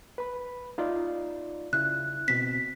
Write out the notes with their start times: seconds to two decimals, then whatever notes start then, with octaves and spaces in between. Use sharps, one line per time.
0.18 B4 B5
0.78 D#4 F4 D5
1.73 C#3 E4 F#6
2.28 B2 C4 B6